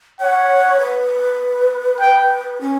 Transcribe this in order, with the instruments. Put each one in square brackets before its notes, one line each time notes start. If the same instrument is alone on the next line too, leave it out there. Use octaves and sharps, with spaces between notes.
[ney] C#5 [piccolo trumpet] F#5
[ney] B4
[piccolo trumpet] G5
[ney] C#4